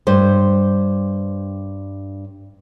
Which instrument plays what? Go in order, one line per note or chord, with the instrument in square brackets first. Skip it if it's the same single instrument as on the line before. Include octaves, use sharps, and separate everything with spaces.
[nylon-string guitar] G2 C5